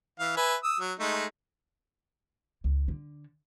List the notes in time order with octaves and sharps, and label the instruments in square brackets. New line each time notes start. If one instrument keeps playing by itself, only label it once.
[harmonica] E3 F5
B4 E5 G#5
D#6 E6
F#3
G#3 A3 D#4
[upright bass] C#2
D3